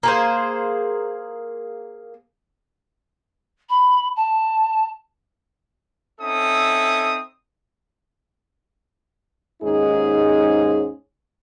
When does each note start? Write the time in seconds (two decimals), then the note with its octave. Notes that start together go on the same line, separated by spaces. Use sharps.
0.03 A#3 G#4 C5
3.69 B5
4.16 A5
6.20 C4 C#4 D#4 A4 E5 D#6
9.63 D#2 G#2 C#4 D#4 G#4